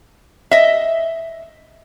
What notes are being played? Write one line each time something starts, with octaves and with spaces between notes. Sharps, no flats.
D#5 E5